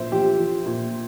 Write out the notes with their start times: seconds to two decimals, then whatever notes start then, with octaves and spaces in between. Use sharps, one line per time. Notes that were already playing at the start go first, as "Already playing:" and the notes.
Already playing: A#2 F3 C5 E5
0.12 F3 G4
0.38 F3
0.66 A#2